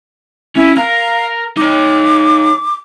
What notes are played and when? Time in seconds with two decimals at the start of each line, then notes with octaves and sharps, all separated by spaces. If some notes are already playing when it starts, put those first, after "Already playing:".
0.56 C#4 E4
0.77 A#4 F5 A#5
1.57 D#4 C#5 D6